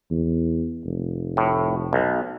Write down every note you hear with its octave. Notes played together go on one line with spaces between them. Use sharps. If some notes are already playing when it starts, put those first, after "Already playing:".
E2
F1
A2
B1